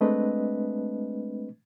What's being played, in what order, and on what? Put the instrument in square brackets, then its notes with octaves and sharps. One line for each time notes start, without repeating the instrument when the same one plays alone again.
[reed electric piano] G#3 A3 C4 D4 B4 D#5